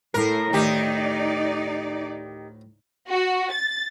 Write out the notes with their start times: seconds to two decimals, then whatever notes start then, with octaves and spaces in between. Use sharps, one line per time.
0.14 A2 A#4
0.53 D2 A2 D#3 D#4 G4 D5
3.09 F#4
3.52 A6